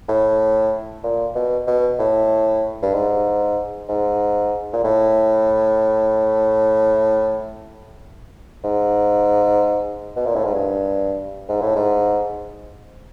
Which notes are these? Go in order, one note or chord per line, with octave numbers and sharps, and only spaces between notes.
A2
A#2
B2
B2
A2
G2
G#2
G#2
A#2
A2
G#2
B2
A#2
A2
G#2
G2
G#2
A2
G#2